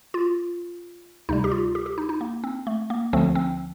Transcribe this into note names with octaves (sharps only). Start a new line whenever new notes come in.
F4
D2 C3 G3 D#4
G4
F4
G4
G4
D#4
D#4
A#3
C4
A3
A#3
D2 D3 F3 A3 C4
C4